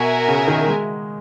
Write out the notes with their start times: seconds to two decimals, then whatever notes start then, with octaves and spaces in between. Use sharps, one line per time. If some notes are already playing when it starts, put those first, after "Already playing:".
Already playing: B2 F#4 A#4 E5 G#5
0.28 C#3
0.48 D#3
0.68 G#3